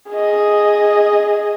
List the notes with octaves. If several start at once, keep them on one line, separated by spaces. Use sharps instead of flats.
G#4 D#5